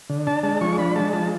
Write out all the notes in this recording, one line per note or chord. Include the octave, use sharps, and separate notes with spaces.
D3
D4 A5
G#3 A5
F3 C#6
D4 B5
G#3 A5
F3 A5